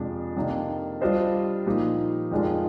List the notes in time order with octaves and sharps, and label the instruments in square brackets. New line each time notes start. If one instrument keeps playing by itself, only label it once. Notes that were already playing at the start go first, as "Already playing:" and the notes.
Already playing: [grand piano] F2 C3 F3 G#3 D4
C3 D#3 A#3 D4
G3 D4 F4 C5 D#5
A#2 F3 A#3 D#4 G4
F2 D#3 G#3 D4 F4